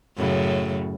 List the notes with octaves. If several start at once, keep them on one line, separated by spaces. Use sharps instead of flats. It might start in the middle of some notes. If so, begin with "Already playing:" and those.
F#2 A2 C#3